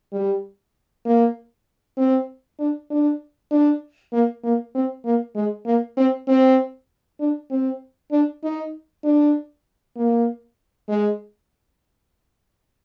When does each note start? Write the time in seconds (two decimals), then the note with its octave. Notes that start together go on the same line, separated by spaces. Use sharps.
0.13 G3
1.05 A#3
1.97 C4
2.59 D4
2.90 D4
3.51 D4
4.12 A#3
4.44 A#3
4.75 C4
5.05 A#3
5.36 G#3
5.66 A#3
5.97 C4
6.28 C4
7.20 D4
7.50 C4
8.12 D4
8.44 D#4
9.04 D4
9.96 A#3
10.88 G#3